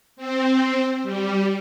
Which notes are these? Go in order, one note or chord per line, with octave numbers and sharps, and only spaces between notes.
C4
G3